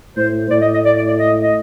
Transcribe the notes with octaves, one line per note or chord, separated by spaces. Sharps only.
A2 C5
C5
A2 D5
D#5
D#5
D5
D5
D5
D#5
D#5